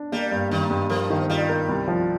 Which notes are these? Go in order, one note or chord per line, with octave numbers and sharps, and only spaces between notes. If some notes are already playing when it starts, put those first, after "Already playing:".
Already playing: D4
G3 A#3
G2
G2 D#3
G2
F3 A#4
D#3
G3 F4
A#4
C2
F3